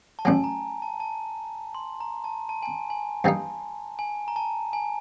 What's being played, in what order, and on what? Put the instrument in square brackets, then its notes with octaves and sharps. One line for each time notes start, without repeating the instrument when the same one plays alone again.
[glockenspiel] A5
[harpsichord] A1 A2 F#3 [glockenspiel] G#5
[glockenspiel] A#5
A5
A5
C6
A#5
A5
A5
G#5
G#5
[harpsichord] G2 E3 G3 A#3 D#4
[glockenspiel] G#5
A#5
A5
G#5